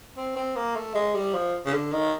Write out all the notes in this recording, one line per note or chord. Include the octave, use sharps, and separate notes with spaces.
C4
C4
A#3
A3
G#3
G3
F3
C#3
D3
D#3